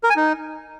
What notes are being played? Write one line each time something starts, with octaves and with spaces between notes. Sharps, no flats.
A#4
G#5
D#4